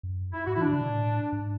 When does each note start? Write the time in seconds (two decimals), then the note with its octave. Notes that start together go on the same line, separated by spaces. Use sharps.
0.03 F#2
0.33 E4
0.46 G#2 F#4
0.54 E4
0.57 E3
0.61 D3 D4
0.73 C#3
0.81 B2
0.90 A2
1.32 G#2